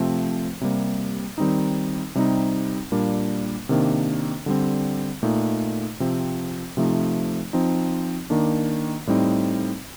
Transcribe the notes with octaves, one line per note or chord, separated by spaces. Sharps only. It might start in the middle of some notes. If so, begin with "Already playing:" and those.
Already playing: C3 F3 A3 C4
C3 G3 A#3
D#3 G3 C4 D#4
C3 G3 C4 D#4
A#2 G3 A#3 D4
C3 D#3 A#3 D4
D3 G3 C4
A#2 A3 D#4
C3 F3 C4
C3 F3 A3 D#4
F3 C4 D#4
D#3 A#3 D4
A2 G3 C4 D#4